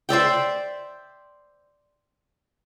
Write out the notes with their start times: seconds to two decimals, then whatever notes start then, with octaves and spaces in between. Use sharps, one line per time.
0.09 C5 D5 E5 G5